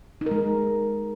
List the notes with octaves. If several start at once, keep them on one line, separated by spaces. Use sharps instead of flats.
D#4
A#4
G#3